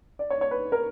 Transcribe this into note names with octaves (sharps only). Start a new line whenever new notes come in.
D5
C#5
C#5
B4
A#4